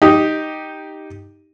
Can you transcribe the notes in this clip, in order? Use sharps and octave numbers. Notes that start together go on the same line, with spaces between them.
D#4 G4